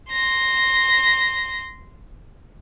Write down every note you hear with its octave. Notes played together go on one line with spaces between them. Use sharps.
C6 A#6